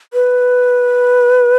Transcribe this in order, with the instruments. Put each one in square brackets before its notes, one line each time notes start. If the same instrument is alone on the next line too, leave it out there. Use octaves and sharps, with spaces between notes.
[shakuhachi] B4